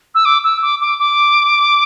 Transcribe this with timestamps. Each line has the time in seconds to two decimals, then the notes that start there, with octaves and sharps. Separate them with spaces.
0.14 E6
0.25 D6
0.43 E6
0.62 D6
0.81 D6
0.99 D6